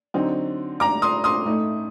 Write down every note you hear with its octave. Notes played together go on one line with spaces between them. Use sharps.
D3 F#3 C4 D#4
A#5 D6
C6 D#6
C6 D#6
A2 A3 D#4